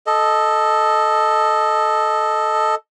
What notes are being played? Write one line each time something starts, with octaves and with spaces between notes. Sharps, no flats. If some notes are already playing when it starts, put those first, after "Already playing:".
A4 D#5